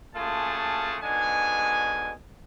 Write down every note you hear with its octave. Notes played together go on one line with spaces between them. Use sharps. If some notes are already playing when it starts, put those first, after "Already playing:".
F#2 A#2 A3 F4 G#4 A5
G#2 B2 D3 G#3 G#5